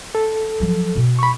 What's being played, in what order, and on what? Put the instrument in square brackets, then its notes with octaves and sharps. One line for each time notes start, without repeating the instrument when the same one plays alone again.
[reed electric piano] A4
[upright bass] F3 F#3
B2
[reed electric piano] B5 C#6